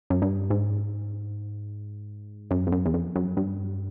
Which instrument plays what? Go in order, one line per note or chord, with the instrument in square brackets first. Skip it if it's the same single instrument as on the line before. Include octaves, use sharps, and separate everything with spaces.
[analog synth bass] F#2
G2
G#2
F#2
F2
F#2
E2
F2
F#2
G2